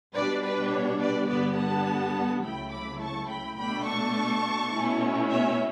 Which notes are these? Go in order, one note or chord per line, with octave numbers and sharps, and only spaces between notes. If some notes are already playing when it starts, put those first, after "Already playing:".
B2 G3 D4 B4 D5
B4 D5
C#5
B4 D5
G2 D3 G3 B3 B4 D5
F#5 A5
C#2 C#3 F#3 A3 E4 G5 B5
B5 D6
A5 C#6
G5 B5
B2 A3 D4 G5 B5
A5 C#6
B2 A3 C#4 E4
C#5 E5